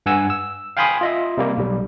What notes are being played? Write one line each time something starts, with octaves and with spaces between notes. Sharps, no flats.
G2 F#5 G#5 E6
E6
F5 G5 G#5 B5 C6 D#6
F4 D#5 E5
C3 G3 A#3
B1 G3